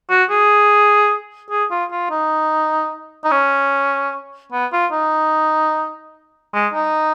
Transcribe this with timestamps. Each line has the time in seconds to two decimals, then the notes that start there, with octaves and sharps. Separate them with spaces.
0.10 F#4
0.29 G#4
1.50 G#4
1.71 F4
1.91 F4
2.10 D#4
3.24 D#4
3.31 C#4
4.52 B3
4.72 F4
4.92 D#4
6.54 G#3
6.73 D#4